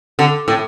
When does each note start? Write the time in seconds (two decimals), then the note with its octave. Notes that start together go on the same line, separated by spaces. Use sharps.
0.19 D3
0.48 A2